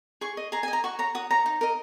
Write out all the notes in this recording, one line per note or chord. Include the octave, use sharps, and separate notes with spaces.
G#4 C#6
D#5
G#4 A#5
G#5
D#5
A#5
F#4 C#6
C#5 A#5
F#4 D#6
C#5 A#5
D#4
A#4 D#5